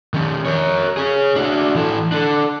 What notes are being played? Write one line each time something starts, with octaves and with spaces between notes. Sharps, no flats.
D#3 C#4
A#4 C#5
G#4 C#5
D4 F#4
E3 A4
D4 A4